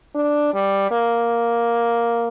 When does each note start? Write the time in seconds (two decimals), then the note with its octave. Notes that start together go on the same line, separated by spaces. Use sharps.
0.15 D4
0.54 G3
0.91 A#3